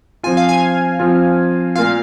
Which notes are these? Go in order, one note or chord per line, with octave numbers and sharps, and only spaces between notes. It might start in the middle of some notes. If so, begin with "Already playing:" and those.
F3 C4 F4 G#5
F5
G#5
F3 C4 F4
A#2 A#3 F4 F5